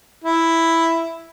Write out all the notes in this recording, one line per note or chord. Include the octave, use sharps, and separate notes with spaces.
E4